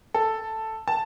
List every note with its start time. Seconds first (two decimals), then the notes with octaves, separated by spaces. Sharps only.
0.14 A4
0.88 A5